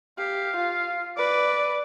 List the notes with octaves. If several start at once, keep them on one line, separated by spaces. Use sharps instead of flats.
G4 F5
F4
B4 D5 D6